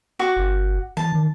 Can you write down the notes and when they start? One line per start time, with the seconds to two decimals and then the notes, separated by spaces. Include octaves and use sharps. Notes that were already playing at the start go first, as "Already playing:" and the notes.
0.19 F#4 C#6 D6
0.36 G1
0.97 E3 A5
1.12 D#3